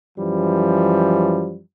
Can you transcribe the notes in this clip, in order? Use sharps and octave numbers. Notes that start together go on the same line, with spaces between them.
F#2 E3 F3 G3